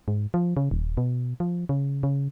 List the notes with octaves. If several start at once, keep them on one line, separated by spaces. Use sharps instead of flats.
G#2
F3
C#3
D#1
B2
F3
C#3
C#3